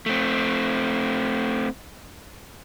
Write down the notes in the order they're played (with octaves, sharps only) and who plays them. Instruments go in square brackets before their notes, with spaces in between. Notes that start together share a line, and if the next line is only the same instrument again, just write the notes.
[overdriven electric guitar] A3 C4